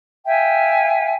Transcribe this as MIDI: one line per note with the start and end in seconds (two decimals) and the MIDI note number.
0.24 1.13 76
0.24 1.13 77
0.24 1.13 79
0.24 1.13 80